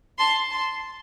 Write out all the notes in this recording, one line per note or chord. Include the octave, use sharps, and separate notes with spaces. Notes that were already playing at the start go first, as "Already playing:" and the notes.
A5 C6
A5 C6